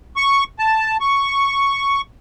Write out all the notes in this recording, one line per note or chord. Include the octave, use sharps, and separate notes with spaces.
C#6
A5
C#6